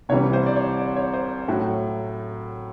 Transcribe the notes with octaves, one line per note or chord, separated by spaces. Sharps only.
C2 C3 E3 G3 C#5
C5
D5
C#5
D5
C#5
C5
A2 F#3 A3 F#4